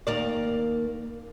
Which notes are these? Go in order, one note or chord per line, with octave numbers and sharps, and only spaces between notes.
D#2 A#3 D5